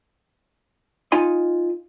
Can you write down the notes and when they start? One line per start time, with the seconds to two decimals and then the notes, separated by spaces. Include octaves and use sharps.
1.12 D#4 F4 G#5 C6